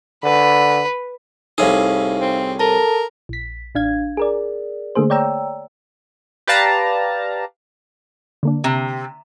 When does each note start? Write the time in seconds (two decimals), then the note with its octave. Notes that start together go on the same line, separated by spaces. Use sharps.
0.24 D3 B4
1.58 C2 A2 D#4 G#4 E5 F5
2.20 C4
2.59 A4 A#4 A5
3.29 A#1 B6
3.75 A1 D4 F5 G#6
4.17 G#4 A#4 D5
4.95 D3 A3 A#3 G#4 C5
5.10 C#5 D5 G5 A#5 E6
6.47 G4 B4 D5 F5 A5 A#5
8.43 D3 A#3 D4
8.64 C3